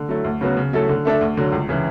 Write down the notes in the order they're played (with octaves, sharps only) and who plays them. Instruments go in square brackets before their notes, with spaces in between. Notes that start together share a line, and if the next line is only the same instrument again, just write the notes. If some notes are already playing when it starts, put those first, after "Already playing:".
Already playing: [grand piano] D3
F#3 A3 E4
D2
C#3 F#3 B3 F#4
C#3
F#3 A3 E4 A4
D3
A3 D4 A4 E5
D2
D3 F#3
C#2
C#3 E3